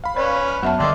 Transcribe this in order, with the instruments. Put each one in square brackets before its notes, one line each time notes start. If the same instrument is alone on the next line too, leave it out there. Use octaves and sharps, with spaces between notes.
[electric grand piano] F5 B5
[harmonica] C#4 B4 C#5 [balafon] D5
[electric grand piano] F6
[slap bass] F#2 [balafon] B3 E5 A5 [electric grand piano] F#5
[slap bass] G1 D3 [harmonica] D5 C6 E6 [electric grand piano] D#5 G5